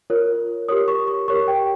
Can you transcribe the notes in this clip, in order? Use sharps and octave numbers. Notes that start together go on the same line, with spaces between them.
F4 A#4 C#5
G4 A#4 C#5 D#6
C#6
C#6
G4 A#4 C#5 C#6
G5